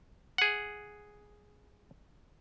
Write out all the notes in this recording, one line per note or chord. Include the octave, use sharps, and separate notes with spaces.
G#4 F#5